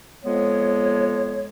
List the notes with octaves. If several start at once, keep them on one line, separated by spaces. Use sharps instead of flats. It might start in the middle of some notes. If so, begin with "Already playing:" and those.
F2 G#3 B3 C#5